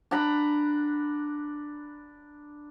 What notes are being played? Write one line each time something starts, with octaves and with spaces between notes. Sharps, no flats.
D4 F#5 A#5 B5